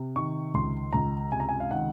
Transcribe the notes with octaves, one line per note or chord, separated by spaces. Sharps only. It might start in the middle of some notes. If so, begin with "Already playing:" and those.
Already playing: C3
D#3 C#6
C#2 C6
C#2 A#5
C3 G#5
A#5
G#5
F5
D#3 F#5